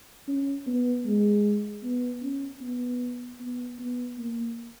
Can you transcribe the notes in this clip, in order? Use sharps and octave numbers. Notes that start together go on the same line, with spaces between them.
C#4
B3
G#3
B3
C#4
B3
B3
B3
A#3